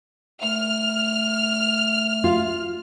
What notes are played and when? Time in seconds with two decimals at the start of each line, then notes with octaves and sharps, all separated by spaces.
0.42 A3 F6
2.24 F4